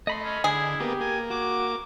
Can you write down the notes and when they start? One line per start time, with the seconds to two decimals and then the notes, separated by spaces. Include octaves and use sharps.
0.07 A3 D#5 B5 C6
0.24 C#4
0.44 D3 E4 G#4
0.80 A#3 B3 G4
1.00 A#3 G#5
1.30 F#4 D6